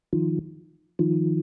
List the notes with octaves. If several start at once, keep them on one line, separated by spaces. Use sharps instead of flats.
D#3 F3
D#3 F3